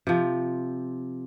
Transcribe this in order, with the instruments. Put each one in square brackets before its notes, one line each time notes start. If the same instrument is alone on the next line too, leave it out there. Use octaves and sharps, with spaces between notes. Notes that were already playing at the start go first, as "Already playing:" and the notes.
[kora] C3 F3